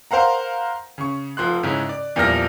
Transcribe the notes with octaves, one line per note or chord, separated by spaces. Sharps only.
A#4 C5 F5 F#5 A#5
C#3 C#6
F1 F3 C6 F#6
G#2 C#3 C#4 E4
D5
E2 A#2 F3 G3 F6 A#6